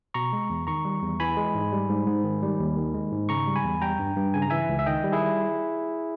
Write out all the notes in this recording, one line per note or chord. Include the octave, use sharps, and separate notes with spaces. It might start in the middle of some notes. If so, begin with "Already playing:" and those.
B2 A#5 C#6
G#3
E2
D#3 A#5 C#6
G3
E2
E3 G#5 B5
G#3
G#2
G3
G#2
G#2
D#3
G3
D#2
D#3
G#3
G#2
C#3 A#5 C#6
G3
G#5 B5
E2
G3 G5 A#5
G2
G2
C#3 G#5
A#5
E3 E5 G#5
C#2
E5
D#3 D#5 G5
G3
E4 G#4